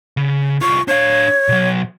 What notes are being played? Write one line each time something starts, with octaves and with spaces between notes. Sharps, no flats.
C#3
C2 F4 C#6
D4 C#5 F5
B2 F#3